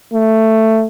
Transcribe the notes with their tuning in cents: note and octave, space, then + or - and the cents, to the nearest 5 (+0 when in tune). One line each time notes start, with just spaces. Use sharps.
A3 +10